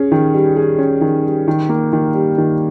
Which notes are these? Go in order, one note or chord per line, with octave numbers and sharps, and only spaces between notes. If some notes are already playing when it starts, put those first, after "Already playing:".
Already playing: C#4 G#4
D#3
G3
G#4
C#4
D#3
G3
D#3
A#3
D#3
G3
D#3